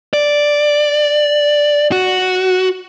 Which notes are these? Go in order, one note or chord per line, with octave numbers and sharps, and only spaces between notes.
D5
F#4